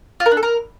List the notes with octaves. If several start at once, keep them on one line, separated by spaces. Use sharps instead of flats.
F4
A#4
D4
A4
A#4